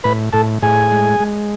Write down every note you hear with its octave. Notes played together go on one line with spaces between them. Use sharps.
A2 B4 B5
A2 A4 A5
A2 G#4 G#5
G#3
G#3